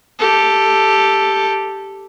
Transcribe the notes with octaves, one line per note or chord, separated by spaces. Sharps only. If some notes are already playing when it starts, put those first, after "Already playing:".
G4 A4